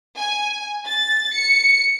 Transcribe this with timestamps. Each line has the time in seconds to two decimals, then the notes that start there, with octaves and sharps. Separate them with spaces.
0.17 G#5
0.86 A6
1.33 C#7